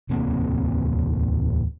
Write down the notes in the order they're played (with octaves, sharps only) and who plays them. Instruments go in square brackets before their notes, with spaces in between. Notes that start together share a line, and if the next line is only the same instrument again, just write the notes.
[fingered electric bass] D1 E2 C3 A#3